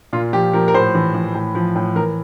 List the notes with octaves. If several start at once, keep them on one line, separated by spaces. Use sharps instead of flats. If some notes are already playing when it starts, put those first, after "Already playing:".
A#2 F4
F3 G4
F3 A#4
A#4
A2 C5
E3
E3
A2
F3
A2
E3 A#4